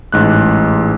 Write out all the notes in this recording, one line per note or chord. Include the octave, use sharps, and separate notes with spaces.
A1 G#2 F#6